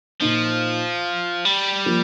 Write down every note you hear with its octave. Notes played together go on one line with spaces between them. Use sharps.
A#2 F3 A#3 D#4
G3
F3 A#3